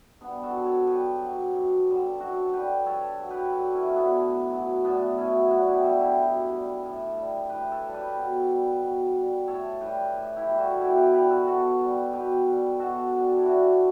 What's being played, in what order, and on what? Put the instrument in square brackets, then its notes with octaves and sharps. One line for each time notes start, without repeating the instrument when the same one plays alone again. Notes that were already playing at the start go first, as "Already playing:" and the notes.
[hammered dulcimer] G2 B3 D4
F#4 A4
F#3
A4 C#5
G2 G4 B4
F#3
F#2
D3 G3
F#2 F#4 A4
D3 G3 G4 B4
G2 A4 C#5
F#3
G4 B4
G2 F#4 A4
C#4 E4
F#3 C#4
B3 D4
A2
F#3
A2 B3 D4
F#3 C#4 E4
B2 D4 F#4
E4 G4
G3 F#4 A4
E4 G4
B2
G3
A2
G3
A2 G4 B4
A4 C#5
G3
G4 B4
B2
G3
B2
G3
A2 A4 C#5
E3 G3 G4 B4
A2
E4 G4
E3 G3
F#4 A4
B2 E4 G4
G4 B4
G3 G4 B4
F#4 A4
B2 F#4 A4
G3
B2 G4 B4
G3
B2 F#4 A4
G3 D4 F#4
E4
G2 D4 F#4